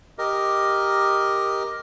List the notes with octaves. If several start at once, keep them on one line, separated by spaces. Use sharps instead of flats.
G4 A#4 D#5